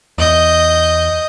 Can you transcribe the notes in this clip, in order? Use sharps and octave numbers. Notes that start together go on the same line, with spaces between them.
E2 D#5 G6